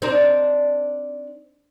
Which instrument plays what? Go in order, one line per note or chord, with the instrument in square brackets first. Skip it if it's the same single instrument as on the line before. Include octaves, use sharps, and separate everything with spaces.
[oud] C4 D4 D#4